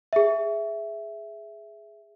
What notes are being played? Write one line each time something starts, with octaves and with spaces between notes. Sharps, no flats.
G#4 E5